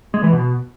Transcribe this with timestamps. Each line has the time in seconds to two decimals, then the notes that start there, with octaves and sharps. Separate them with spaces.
0.14 G#3
0.23 E3
0.33 B2